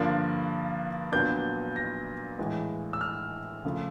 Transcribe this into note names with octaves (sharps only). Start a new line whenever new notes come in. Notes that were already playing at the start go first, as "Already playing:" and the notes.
Already playing: G2 D3 F3 A#3 D4
A#2 F#3 B3 D4 G6
A#6
A2 E3 G#3
E6
F6
C#3 F3 A3